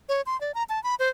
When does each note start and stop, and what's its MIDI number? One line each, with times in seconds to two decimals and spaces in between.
0.09 0.22 73
0.26 0.39 84
0.41 0.52 74
0.55 0.63 82
0.69 0.82 81
0.84 0.95 83
0.99 1.09 72